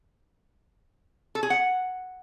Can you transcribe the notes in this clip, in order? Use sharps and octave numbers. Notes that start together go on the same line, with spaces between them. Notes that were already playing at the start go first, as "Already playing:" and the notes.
A4
G#4
F#5